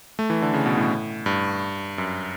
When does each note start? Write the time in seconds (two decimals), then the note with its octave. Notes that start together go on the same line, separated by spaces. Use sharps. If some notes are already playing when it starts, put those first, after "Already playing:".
0.19 A3
0.30 E3
0.42 D3
0.54 C#3
0.66 B2
0.77 A2
1.26 G2
1.98 F#2